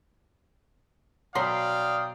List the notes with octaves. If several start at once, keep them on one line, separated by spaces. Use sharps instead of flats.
B2 F#3 D5 F5 G5 A#5 C6 D#6